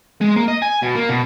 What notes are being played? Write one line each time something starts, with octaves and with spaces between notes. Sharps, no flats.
G#3
A#3
D#5
G#5
B2
A#3
B2